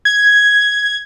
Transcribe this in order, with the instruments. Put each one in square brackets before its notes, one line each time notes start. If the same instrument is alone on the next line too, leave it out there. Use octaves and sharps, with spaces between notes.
[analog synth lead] G#6